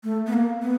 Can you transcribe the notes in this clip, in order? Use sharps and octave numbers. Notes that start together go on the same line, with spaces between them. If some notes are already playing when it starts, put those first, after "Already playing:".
A3
B3
A#3
B3